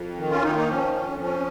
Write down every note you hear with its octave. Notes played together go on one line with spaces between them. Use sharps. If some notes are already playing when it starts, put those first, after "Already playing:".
Already playing: F2
D#3
C#4 F4
D#3 A#3 D#4
F4
A#3 D#4
F3 C#4
F2 C#4
F3 C#4